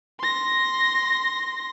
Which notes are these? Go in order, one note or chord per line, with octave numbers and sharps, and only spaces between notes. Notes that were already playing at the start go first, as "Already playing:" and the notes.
C6 A#6